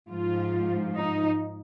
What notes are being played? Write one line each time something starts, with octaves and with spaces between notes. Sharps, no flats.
G#2 F3 F4
D#4